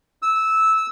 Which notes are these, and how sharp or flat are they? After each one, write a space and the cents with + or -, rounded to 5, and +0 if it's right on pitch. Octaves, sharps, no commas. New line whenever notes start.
E6 -15